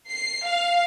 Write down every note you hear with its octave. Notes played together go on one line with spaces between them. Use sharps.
C7
F5